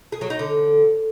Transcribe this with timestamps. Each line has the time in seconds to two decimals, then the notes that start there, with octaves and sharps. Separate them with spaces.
0.12 G#4
0.21 F#3
0.30 D#4
0.39 D3